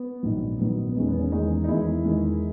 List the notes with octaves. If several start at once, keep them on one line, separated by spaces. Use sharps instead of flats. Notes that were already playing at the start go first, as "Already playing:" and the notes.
Already playing: B3
A#1 G#2 D#3 F#3
A#1 G#2 D#3 F#3 B3
B3
E2 D#3 G#3 C#4
B3
C#4
E2 D#3 G#3 D#4
D#4
E2 D#3 G#3 E4
E2 D#3 G#3